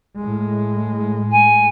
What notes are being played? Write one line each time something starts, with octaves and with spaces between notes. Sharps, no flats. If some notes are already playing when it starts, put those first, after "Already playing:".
A2 G#3
G#5